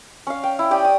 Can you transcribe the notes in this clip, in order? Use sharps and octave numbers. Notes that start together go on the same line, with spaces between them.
C#4 F5
G5
E4
G4 D5 G5 D#6
D#6